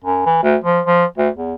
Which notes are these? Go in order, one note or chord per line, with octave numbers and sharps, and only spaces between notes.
F#2
E3
D2
F3
F3
D2
E2